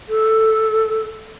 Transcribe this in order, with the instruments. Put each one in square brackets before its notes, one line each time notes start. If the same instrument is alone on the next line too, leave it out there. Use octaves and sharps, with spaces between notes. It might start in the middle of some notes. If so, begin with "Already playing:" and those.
[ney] A4